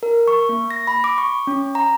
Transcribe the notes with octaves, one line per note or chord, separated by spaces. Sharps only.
A#4
C#6
A#3
A#6
B5
D6
C#6
C#4
A#5